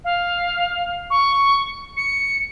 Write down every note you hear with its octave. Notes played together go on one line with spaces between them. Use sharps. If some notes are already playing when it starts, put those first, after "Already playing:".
F5
C#6
C#7